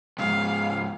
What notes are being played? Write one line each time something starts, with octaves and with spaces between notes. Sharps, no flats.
C#2 G#2 F5